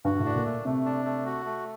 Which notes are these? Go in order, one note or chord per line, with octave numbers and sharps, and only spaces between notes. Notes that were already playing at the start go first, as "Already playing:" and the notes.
G2 F#4
A2
D4
A#2
A3
C3 A3
D4
A3
F#4
A3